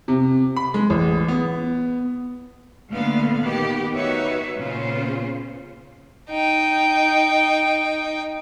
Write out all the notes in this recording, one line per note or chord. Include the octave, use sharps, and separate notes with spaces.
C3
B5
G#3
A1
B3
A#2 D3 A3 B3 F5
D#3 B3 G4
D#4 F#4 B4 C#5 E5
A#2 C#3 B3 C#4 F4 C5
D#4 G5